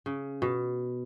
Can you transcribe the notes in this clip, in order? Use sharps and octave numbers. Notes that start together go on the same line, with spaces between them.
C#3
B2